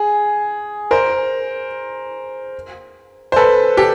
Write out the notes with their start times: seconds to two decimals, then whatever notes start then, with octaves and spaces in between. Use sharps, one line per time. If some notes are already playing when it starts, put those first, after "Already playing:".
Already playing: G#4
0.91 A#4 C5
3.32 C5
3.36 A4 B4
3.77 G4 A4